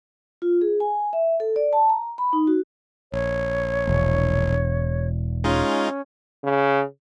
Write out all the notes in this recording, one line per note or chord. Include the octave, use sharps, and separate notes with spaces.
F4
G#4
G#5
E5
A4
D5
A5
A#5
B5
D#4
F#4
A#1 C#5
E1
G#3 C#4 D#4 F4
C#3